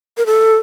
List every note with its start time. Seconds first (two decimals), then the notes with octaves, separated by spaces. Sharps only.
0.17 A#4
0.26 A4